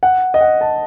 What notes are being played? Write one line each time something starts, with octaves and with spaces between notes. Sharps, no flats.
F#5
D#5
F#5
A5